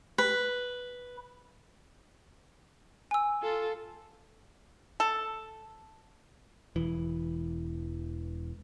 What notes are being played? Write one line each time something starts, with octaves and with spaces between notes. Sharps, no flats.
B4
G#5 E6
F4 A4
A4
E1 E3